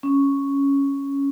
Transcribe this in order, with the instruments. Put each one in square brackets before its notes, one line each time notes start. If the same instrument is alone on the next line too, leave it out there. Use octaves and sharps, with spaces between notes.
[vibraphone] C#4